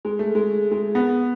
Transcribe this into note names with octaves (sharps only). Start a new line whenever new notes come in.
G#3
A3
G#3
G#3
B3